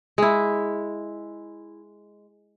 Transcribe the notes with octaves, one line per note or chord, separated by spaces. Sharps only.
G#3 E4